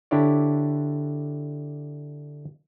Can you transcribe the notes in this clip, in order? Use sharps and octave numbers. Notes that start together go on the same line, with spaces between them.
D3 D4 E4 G4 C#5 D5